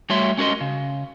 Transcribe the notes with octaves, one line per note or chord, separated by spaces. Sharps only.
G3 A3 F#4 C#5 E5 C6
G#3 C#4 F#4 A#4 D#5 C6
C#3